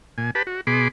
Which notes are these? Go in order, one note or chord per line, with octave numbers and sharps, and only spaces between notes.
A#2 G#5
G4 B4 A5 B5
F#4
B2 G#4 B5 C6 D6